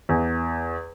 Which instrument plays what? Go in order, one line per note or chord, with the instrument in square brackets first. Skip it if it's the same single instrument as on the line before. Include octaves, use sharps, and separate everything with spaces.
[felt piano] E2